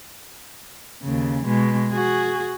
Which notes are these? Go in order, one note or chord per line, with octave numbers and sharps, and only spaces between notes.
D#2 C#3
B2 G#3
F#4 G#4